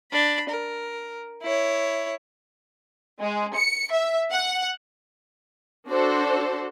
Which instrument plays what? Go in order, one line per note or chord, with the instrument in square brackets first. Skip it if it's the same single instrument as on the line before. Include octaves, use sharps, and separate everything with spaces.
[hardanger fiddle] D4 B5
A#4
E4 C#5
[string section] G#3
C#7
E5
F#5
D4 F#4 A4 C5